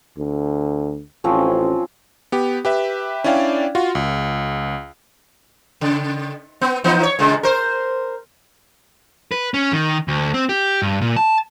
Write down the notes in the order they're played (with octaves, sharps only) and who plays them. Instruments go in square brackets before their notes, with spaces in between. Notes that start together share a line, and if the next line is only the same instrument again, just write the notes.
[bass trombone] D2
[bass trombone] A1 [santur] F3 C4 C#4
[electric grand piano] B3 G4
G4 B4 E5
C#4 D4 E4 D5 F5 G5
F4 F#4
C#2
[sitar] C#3
B3
E3 B3 D#4
C#5
A#2 C#3 G#3
A#4 C5
[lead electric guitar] B4
C#4
D#3
D2
C4
G4
G2
A#2
A5